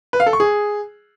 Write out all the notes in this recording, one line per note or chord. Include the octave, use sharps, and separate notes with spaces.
B4
F5
A4
C#6
G#4